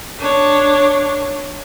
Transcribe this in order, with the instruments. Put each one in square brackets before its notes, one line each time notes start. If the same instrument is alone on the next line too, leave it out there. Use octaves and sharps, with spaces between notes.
[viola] D4 C#5